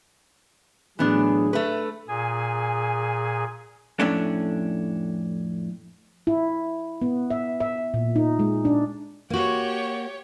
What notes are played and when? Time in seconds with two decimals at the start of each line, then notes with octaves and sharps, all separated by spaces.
0.99 A2 E3 F#3 B3 D4 G#4
1.53 A3 B4
2.08 A#2 G#4 G#5
4.00 F2 A2 A3 C#4 D4
6.27 E4
7.02 B3
7.30 E5
7.60 E5
7.94 A#2
8.16 D#4
8.39 G#3
8.65 D4
9.30 A#3 F#4 G4 C#5